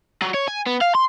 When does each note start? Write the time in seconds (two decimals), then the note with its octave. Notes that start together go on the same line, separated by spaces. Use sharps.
0.22 F#3
0.34 C#5
0.48 G#5
0.66 B3
0.81 F5
0.95 C6